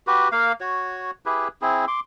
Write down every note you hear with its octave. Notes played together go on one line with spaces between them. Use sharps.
F#4 G4 B4
A#3 F5
F#4 C#5
E4 G4 G#4 B4
C4 E4 G#4
C6 D6